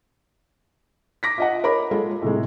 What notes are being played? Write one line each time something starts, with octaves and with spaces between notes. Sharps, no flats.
D6 A#6 B6
F4 D#5 F#5
A#4 C#5 B5 D6
G#3 F4 A4
A2 C3 G#3